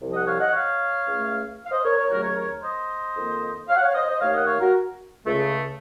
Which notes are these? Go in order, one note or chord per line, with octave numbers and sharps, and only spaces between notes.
C2 C3 F3
D#5 F#5
C#5 F5
D#5 F#5
C#5 F5
C#2 C#3 A3
F5
C5 D#5
A#4 C#5
A#4 C#5
D#2 C#3 F#3 A3 F#4 A#4
A#4 C#5
A#4 C#5
C5 D#5
F2 D#3 A#3
C#5 F5
F#5
C#5 F5
C5 D#5
C5 D#5
D#2 D#3 A3 C#5 F5
D#5 F#5
C#5 F5
F#4 A#4
C#2 C#3 A3